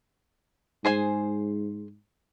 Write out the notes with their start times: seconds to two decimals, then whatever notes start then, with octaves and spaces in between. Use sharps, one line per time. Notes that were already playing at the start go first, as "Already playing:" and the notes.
0.85 G#2 G#4 C5 G#5